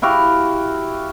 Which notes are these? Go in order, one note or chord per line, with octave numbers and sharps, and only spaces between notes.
E4 F#4 G4 F5